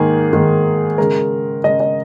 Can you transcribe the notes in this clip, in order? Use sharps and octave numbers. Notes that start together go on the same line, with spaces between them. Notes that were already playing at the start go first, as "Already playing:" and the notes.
Already playing: G#2 D#3 A#3 G#4
G#2 D#3 A#3
C#3 G#3 A#4
C#3 G#3 D#5
D#5